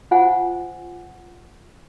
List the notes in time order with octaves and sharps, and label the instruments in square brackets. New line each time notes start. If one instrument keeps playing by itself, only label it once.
[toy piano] F4 C5 F#5 G#5